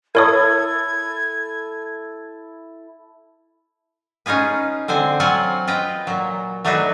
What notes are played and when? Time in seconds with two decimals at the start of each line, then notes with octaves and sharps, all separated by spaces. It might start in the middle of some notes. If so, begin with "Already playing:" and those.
0.15 E4 A4 A#4 C#5 D#6 G#6
4.26 C#4 D#4 F4 G#4 B4
4.88 D3 C4 C5 G#5
5.20 F#3 C4 F4 F#5 G#5
5.67 F4 B4 D#5 G5
6.07 A#2 F#3
6.65 F#3 A3 D4 D#4 F#4 B4